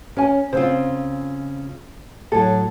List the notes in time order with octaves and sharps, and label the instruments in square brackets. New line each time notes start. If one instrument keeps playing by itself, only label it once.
[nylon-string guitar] C#4 [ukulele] A#4 G#5
[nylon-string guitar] C#3 C4 F4 [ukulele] C5
[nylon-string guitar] A2 F#3 [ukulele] A4